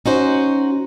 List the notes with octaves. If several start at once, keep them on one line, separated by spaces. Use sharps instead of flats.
C#4 D#4 F#4 C5